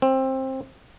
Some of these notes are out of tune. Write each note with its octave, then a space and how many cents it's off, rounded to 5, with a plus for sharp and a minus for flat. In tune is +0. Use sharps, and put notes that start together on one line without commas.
C4 +20